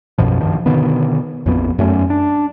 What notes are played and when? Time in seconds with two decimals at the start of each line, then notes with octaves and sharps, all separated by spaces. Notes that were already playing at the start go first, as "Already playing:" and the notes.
0.18 B1 F#2 B2 F3
0.41 G2 D#3 F3
0.66 B2 D3 D#3 B3
1.46 A#1 F2 B3
1.79 F#2 A3 C#4
2.10 D4